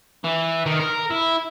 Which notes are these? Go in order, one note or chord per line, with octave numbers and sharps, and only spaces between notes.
E3
D#3
A#4
E4